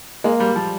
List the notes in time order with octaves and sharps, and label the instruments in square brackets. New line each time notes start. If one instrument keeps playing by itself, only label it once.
[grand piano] G#3 [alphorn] A#3
[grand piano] G3
F3